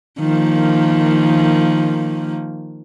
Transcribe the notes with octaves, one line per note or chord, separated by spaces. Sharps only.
D#3 F3 A#3